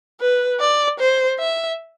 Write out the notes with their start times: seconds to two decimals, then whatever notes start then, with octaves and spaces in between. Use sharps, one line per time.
0.21 B4
0.60 D5
1.00 C5
1.39 E5